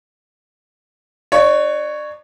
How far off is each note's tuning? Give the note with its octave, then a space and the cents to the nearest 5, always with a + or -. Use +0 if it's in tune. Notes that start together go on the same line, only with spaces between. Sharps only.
D4 +35 C#5 +0